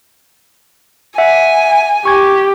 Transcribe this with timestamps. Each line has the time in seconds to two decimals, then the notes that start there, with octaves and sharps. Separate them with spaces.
1.18 E5 F#5 G#5
2.05 G4 C#6 G#6